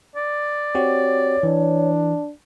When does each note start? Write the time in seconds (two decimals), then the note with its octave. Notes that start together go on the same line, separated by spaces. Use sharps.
0.16 D5
0.75 C4 F#4 G4 C#5
1.43 E3 D4